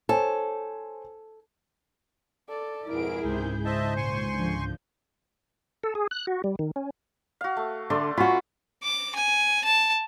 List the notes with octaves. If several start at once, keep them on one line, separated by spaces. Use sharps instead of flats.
A4 C5 C#5 G#5
A4 D5
F2 G#2 B2 E4 G#4 A#4 D7
C#2 G#2 C3 G6
C5 D#5 E5 A5
A#2 G#5 C6 C#6
D3 F3
A4
G#4
F#6
F#4
G3
D#3
C#4
F#4 F5
A3
D3 A3 D5 C6
C#4 F4 F#4 B5 C6
D6
G#5
A5